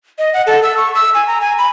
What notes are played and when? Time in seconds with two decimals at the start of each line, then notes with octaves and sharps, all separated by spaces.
0.18 D#5
0.33 F#5
0.47 A4
0.63 E6
0.77 C#6
0.95 E6
1.14 G#5
1.27 A#5
1.41 G#5
1.58 B5